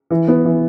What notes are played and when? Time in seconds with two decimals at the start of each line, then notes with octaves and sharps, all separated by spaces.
0.10 E3
0.28 B3
0.45 E3